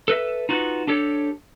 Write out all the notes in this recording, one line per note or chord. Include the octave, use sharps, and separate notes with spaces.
A4 B4 D#5 E5
D#4 F4 F#4 B4
D4 G4 A4 C#5